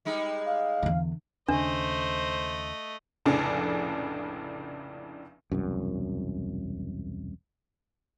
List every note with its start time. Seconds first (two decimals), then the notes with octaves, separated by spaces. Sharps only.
0.05 G3 G#3 D#4
0.46 F5
0.83 E2 D3
1.48 D#2 C#3 A3 D4 C5 D#5
3.26 F1 A#1 A2 C#3 D4
5.52 E1 C2 F#2